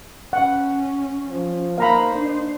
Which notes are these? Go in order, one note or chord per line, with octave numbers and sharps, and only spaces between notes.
C#4 F#5
F3
A#3 D#4 C5 F5 A#5 B5
D4